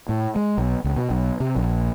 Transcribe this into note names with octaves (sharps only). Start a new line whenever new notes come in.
A2
G#3
B1
C#2
B2
B1
C3
A#1